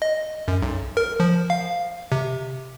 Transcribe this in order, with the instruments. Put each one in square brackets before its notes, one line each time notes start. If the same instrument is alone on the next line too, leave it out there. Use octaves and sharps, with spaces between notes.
[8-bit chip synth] D#5
F#2
B1
A#4
F3
F5
C3